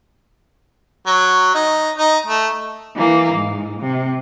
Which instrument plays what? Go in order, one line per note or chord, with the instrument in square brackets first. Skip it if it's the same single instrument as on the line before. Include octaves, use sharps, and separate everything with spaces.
[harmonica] F#3
D#4
D#4
A3
[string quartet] E3 A#3
G#2
C3